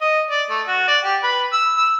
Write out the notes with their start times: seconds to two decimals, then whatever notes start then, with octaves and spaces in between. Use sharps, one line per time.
0.01 D#5
0.31 D5
0.51 A3
0.68 F#4
0.88 D5
1.05 G4
1.23 B4
1.53 E6
1.77 E6